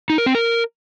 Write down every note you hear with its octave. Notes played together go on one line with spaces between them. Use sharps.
D#4
A#4
C4
A#4